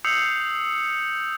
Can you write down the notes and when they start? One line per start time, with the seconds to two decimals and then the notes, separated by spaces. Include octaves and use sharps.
0.05 D#6 E6 G6 C7 C#7 F7